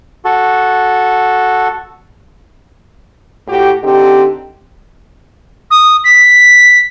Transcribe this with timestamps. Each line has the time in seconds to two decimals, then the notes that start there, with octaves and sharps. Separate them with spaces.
0.25 F#4 A4
3.47 A2 F#4 G4
3.83 D3 C4 D#4 G4
5.70 D#6
6.04 B6